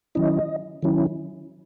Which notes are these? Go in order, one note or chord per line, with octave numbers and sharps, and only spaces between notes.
D#3 F#3 C#4 E4 D#5
D#3 F#3 C#4 E4